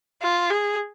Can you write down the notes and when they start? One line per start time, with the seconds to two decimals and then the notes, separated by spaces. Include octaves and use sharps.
0.22 F4
0.51 G#4